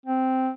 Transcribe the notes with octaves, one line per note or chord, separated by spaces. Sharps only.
C4